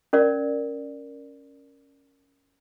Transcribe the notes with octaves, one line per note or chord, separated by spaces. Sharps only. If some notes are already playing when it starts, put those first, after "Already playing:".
C#4 A#4 D5